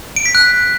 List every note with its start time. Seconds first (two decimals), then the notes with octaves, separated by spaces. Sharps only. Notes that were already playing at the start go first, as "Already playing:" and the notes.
0.16 D7
0.26 B6
0.35 F#6